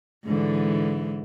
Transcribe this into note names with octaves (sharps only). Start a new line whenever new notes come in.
G#2 D3 E3